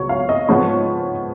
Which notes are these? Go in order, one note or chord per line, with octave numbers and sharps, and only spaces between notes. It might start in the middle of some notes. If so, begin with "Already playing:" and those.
Already playing: C#2 B2 F#3 C#5
F5
D#5
G#2 F3 G#3 B3 C#5